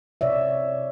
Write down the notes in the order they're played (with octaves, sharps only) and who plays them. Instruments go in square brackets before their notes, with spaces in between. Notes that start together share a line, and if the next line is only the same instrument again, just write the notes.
[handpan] C3 C#5 D5 E5